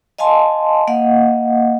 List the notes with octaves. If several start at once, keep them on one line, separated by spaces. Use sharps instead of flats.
D#5 F5 G#5 A5 C6
A#3 D#5 F5 F#5